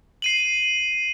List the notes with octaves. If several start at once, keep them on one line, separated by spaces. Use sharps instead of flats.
C7 D#7 F#7